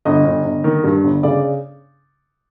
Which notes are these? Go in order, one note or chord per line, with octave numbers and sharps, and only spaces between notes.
G1 D#5
G1
G1
D#3
G2
G1
C#3 D5